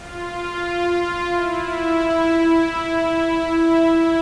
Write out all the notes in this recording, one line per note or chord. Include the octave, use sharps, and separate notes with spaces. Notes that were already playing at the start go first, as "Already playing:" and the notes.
Already playing: F4
E4
E4